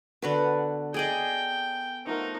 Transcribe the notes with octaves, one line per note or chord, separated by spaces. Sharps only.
D3 B3 F#4 B4
G#4 A4 D5 D#5 G5
F3 A3 D#4 A#4 F#5